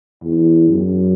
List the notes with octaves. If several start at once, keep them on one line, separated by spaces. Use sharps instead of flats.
E2
F#2